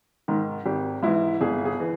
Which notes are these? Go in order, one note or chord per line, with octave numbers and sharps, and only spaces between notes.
G#2 D#3
G#1 G4
G#2 E3 E4
G1 G#4
G#4
E3